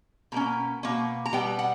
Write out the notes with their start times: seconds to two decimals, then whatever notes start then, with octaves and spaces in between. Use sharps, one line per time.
0.32 B2 A#3 C#4 A#5
0.83 B2 A#3 C#4
1.26 A#5
1.33 B2 G3 B3 G5
1.59 F#5